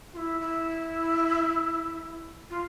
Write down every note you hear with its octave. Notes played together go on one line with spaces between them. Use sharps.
F4
E4
E4
F4